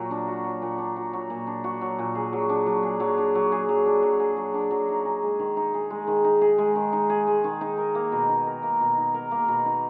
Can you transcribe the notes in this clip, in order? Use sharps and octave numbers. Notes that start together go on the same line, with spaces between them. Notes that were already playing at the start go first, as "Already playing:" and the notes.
Already playing: A#2 F#3 F#4
D4
F#4
F#3
A#2
D4
F#4
F#3
A#2
D4
F#4
F#3
A#2
G#4
F#3
D4
F#3
G#4
F#3
D4
F#3
G#4
F#3
D4
F#3
G#4
F#3
D4
F#3
D#4
G#4
G#3
D#3
D#4
G#4
G#3
D#3
D#4
G#4
G#3
D#3
D#4
G#4
G#3
D#3
D#4
A#4
A#3
B2
D#4
A#4
A#3
B2
D#4
A#4
A#3
B2
D#4